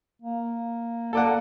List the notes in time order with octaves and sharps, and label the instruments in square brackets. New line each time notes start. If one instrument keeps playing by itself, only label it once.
[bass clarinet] A#3
[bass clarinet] A#3 [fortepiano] A4 D5 F#5